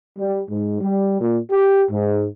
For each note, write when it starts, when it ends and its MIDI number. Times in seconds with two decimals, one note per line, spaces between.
0.18 0.42 55
0.50 0.77 44
0.80 1.19 55
1.21 1.39 46
1.51 1.84 67
1.90 2.25 44